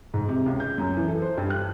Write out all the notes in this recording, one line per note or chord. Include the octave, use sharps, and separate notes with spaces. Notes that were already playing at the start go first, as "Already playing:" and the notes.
G#2
C3
C#2
G6
F#2
E3
A4
C5
G2
F#6